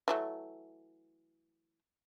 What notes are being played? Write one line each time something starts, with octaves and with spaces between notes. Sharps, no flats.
E3 F#3 A3